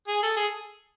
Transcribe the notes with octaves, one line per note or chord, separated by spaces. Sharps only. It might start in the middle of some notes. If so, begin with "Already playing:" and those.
G#4
A4
G#4